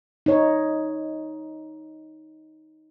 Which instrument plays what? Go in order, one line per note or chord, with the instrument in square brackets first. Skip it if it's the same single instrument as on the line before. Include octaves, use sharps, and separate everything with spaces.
[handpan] D#4 C#5